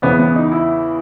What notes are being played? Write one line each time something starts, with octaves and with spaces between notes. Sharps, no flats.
E2 C#3 E3 B3
B3
D#4
E4